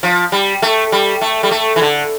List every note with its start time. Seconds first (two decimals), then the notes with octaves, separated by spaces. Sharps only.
0.03 F3
0.32 G3
0.62 A3
0.92 G3
1.21 A3
1.43 G3
1.51 A3
1.76 E3
1.82 D3